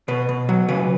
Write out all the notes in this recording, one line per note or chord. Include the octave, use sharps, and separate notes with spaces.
B2 B4
B2
F#3
C#3 B4